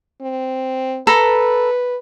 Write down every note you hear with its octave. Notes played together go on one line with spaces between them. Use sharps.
C4
A4 B4 A#5 B5